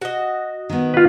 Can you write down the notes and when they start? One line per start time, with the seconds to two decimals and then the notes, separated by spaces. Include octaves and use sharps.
0.01 F#4 D#5
0.70 D#3 B3
0.94 F4 B4